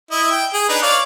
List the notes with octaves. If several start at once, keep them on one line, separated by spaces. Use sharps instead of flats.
E4 D#5
G5
G#4
D4 D#4 B4
C#5 D5 F5